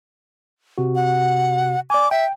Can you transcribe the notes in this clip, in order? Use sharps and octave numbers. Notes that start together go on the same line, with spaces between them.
C3 F#4
F#5
D5 G#5 D6
E5 G5